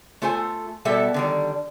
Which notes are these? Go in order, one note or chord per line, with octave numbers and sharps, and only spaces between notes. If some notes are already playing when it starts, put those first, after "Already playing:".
A3 F4 A4 C5 G#5
B2 G3 A4 E5
D3 D#3 G3